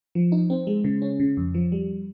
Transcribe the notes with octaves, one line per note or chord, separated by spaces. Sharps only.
F3
D#4
C4
G#3
C#3
C#4
C#3
F2
F3
G3